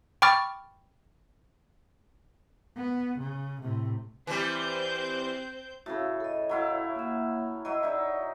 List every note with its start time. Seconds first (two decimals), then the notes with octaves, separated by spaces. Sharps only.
0.22 G5 B5 C#6 D6 F6 A6
2.76 B3
3.19 C#3
3.62 A2 C3
4.27 E3 G3 C4 C5 G6
5.86 A2 C#3 F#4
6.20 A4 D#5
6.49 F#3 E4 F5
6.95 A#3 E5
7.65 F#3 E4 D#5 A#5
7.83 D#4 D5 E5